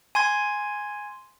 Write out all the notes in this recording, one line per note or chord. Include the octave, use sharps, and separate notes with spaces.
G#5 C6 G#6